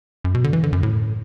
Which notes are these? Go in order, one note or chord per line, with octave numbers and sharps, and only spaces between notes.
F#2
B2
D3
E3
D3
F#2
A2